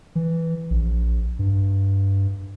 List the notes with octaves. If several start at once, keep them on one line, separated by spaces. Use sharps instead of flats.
E3
A#1
G2